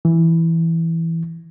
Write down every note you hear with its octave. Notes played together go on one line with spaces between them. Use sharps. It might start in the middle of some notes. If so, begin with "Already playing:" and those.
E3